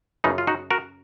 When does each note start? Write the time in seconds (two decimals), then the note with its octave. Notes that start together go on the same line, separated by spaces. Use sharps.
0.24 F#2 C#3 B3 D#4
0.38 F4
0.47 D#4 F#4
0.71 F#4 A#4